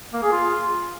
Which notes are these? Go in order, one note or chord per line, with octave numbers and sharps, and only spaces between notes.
A#3
G#4
F4